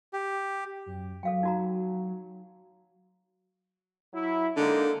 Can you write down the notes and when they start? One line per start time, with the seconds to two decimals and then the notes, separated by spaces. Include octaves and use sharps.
0.13 G4
0.86 F#2
1.23 F#3 A4 F5 G5
1.43 D#4 F#4 A#5
4.13 F#3 E4
4.57 D3 G#3 A#3 D#4